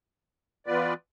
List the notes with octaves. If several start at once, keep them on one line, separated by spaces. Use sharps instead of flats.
E3 B3 F4 B4 D5